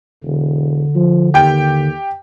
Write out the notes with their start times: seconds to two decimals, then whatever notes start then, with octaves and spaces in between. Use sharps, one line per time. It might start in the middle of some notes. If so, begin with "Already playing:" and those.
0.23 E1 D3
0.95 F3
1.34 D#2 G4 G5